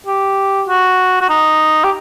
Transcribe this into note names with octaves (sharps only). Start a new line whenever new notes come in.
G4
F#4
F#4
D#4
G4